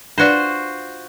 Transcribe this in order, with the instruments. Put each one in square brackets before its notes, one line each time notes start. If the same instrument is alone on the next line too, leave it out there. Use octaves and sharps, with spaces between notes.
[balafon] D4 B4 D5 [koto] F4 F#4 C5